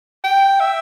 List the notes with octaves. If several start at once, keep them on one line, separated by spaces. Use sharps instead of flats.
G5
E5